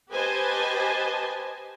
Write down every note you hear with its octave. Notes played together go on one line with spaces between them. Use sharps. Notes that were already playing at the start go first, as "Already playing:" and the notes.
G4 B4 C5 D#5 G#5 A5